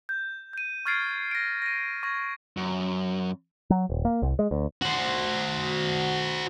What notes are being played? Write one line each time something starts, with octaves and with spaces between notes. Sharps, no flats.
G6
G6 D#7
C#6 F6 G#6 A6 C7 D7
A#6 D7
A#6 D#7
C#6 G#6 A#6
F#2
F#3
D#1
A#3
C2
G#3
D2
F#4 C5